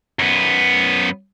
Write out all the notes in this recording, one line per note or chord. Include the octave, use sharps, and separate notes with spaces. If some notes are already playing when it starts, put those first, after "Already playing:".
F#2 B3